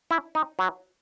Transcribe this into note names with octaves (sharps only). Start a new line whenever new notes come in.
E4
D#4
F#3